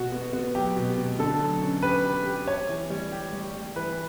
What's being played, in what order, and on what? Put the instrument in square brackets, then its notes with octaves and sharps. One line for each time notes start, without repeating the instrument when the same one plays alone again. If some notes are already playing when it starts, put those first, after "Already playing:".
Already playing: [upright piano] B2 [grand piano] F#4
[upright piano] B3
B3
[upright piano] F#3 [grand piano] G4
[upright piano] B2
B2
[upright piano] D3 [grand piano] A4
[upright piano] F#3
C#4
[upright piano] G4 [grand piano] B4
[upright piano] G4
G4
[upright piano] G4 [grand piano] C#5
[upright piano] E3
G3
G4
G3
G3
[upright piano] E3 [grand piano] B4